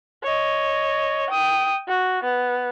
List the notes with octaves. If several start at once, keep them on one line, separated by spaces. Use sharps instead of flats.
C#5 D#5
G5 D#6
F#4
B3